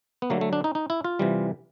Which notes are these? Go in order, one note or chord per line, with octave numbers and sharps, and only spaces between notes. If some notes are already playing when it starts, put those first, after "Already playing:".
B3
D3 F#3 A3 A#3
A3
D4
D#4
D#4
E4
F4
C3 E3 G3